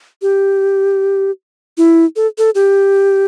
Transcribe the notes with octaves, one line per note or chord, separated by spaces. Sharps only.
G4
E4
A4
A4
G4